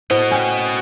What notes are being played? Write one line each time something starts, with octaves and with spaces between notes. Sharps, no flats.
A2 F#4 C5 D#5
C#4 G5